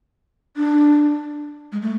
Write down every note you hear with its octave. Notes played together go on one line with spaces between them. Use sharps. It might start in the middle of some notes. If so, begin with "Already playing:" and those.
D4
G#3
A3